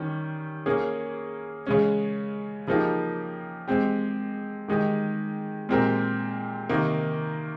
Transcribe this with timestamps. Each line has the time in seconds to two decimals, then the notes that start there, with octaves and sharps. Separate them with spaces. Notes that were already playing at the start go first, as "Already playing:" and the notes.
Already playing: D#3 G3 C#4
0.66 A#3 C#4 G#4
1.67 C#3 G#3 C#4
2.67 C#3 F3 A#3 D#4 G4
3.68 G#3 C4 G4
4.68 D#3 G#3 D#4 G4
5.69 A#2 G#3 C4 G4 A#4
6.69 C3 D#3 A#3 D#4